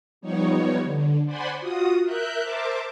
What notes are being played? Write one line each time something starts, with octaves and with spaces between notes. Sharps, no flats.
F3 G3 B3 D#4 C#5
D3
C5 D5 F#5 G#5 B5 C6
F4 F#4 D#6
A#4 E5 F#6 G6
A#4 C5 E5 A5 D6